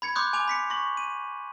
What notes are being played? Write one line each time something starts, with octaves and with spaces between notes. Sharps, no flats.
B5 G#6 C#7
B5 C6 D6 D#6 F#6 G6
G#5 D6 F7
B5 B6 C#7
C#6 A#6 F#7
D#7